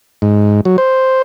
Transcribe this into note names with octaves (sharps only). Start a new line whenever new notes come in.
G#2
F#3
C5